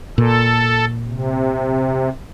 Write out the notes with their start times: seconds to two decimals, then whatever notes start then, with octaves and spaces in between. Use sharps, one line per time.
0.18 A#2 A4
1.07 C3